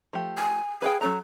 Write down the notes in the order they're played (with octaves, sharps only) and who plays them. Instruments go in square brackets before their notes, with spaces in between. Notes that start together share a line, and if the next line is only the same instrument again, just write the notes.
[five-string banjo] F3 A3 G4
[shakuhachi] G#5
[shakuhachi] G#4 [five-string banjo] B4 F5 G5
[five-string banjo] F#3 C#4 A#5 [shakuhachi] A4